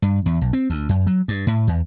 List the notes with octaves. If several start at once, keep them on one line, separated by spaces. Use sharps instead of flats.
G2
E2
B1
C4
D2
F#2
F#3
G2
A2
E2